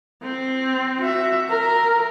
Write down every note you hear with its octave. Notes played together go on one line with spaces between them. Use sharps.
C4
F#4 E5
A#4